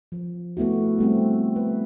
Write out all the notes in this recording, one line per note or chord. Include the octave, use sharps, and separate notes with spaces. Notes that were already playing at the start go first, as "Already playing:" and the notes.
F3
A3 B3 E4 F#4
G3 A3 C4
B4